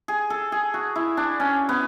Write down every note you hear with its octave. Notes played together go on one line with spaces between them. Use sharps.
G#4
A4
G#4
F#4
E4
D4
C#4
B3